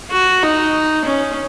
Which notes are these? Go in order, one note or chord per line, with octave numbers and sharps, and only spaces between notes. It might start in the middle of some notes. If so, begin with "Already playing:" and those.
F#4
D#4
C#4